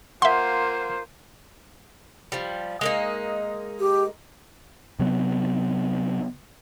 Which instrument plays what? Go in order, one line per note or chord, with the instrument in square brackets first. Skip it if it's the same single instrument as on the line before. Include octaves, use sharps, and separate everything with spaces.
[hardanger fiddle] A#3 [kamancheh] F4 C5 [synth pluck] E5 C6 [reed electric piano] F#5
[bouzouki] F3 G3
G#3 A#3 D#4
[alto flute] G4
[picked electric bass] C3 F#3 B3